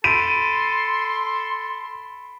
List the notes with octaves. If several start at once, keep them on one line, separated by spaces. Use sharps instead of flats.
A4 B5 C6 B6 D7 D#7